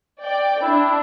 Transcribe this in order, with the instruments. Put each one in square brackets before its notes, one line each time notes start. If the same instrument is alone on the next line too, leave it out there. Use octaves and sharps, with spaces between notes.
[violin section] D5 G5
[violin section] D4 [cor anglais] E4